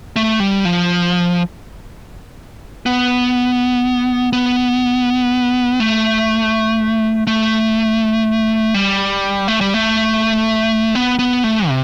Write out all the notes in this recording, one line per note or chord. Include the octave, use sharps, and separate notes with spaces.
A3
G3
F3
B3
B3
A3
A3
G3
A3
G3
A3
B3
B3
A3
C3